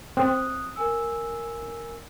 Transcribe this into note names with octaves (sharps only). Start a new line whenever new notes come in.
C4 D#6 F#6
A#4 G#5 E6